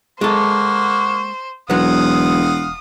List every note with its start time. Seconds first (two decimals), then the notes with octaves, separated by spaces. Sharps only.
0.21 G#3 A#3 A4 C5 F#5 C#6
1.70 E1 F#3 B3 F5 F#5 C6 D#6